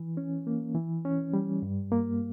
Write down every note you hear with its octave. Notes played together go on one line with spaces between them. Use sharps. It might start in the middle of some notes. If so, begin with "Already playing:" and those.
Already playing: E3
C#4
A#3
E3
C#4
G3
G2
A#3